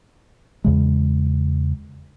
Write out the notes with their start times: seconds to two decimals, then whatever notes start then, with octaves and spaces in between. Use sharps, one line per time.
0.64 E2 C#3 G#3